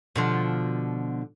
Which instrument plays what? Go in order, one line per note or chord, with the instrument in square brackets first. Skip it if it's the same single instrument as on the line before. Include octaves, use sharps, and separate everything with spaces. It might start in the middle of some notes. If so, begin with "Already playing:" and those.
[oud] B2 D3 F3